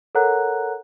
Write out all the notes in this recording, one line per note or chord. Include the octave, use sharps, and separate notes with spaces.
A4 A#4 C#5 F#5 A#5 F#6